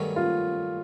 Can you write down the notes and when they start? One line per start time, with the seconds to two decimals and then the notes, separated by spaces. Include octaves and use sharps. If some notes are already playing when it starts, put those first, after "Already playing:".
Already playing: G2 D#3 F#3 A3 C#4
0.16 F4